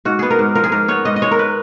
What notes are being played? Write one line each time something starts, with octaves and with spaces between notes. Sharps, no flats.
G#2 F#4
B3 G#4
A#4
G#2
F3 A#4
G#4
G#2 A#4
B3 C#5
G#2 D#5
D#5
G#3 C#5
A#4
B4